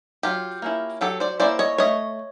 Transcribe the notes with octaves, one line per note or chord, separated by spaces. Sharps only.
F#3 F4 G4
A#3 C#4 E4
F#3 G4 A4
C5 D5
A#3 C#4 E4 C5 D5
C#5 D#5
A3 C#5 D#5